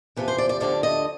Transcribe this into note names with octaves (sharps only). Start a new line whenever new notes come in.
E2 C3 F3 B4
C5
D5
D5
D2 D3 F3 D5
D#5